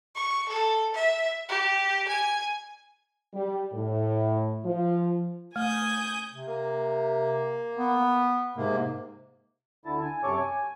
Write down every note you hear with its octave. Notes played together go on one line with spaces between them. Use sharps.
C#6
A4
E5
G4
G#5
G3
A2
F3
A3 G#5 D#6 G6
C3
A#3
B3
G#2 C3 A#3
D2 D3 E4 A5
G#5
F#2 C3 A4 C#5 C#6 D6
G#5